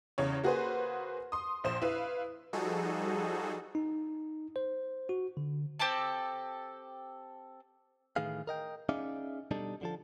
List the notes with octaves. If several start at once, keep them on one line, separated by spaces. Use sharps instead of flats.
E2 C#3 C#5
A#3 F#4 G#4 B4 C5
C6 D#6
A#1 C5 E7
E4 B4 F5
F3 G3 D#4 F#4 G#4 A4
D#4
C5
F#4
D3
C4 G4 A4 A5
A2 D#3 E3 G#4 F5
A#4 D#5 G5
C#4 D#4 G#4 D5 E5 F5
B2 G3 D4 D#4 A4
D3 F3 A4